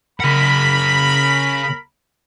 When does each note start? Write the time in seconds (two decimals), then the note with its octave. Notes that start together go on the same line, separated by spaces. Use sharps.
0.20 C#3 A#4 F#5 B5